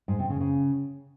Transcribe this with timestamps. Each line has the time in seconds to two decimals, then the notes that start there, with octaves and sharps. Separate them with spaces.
0.08 G#2
0.19 C3
0.30 C#3
0.40 C#3